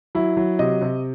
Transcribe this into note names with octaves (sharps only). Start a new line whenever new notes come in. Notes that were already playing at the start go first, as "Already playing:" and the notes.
F#3 E4
F#3
C3 D#5
C3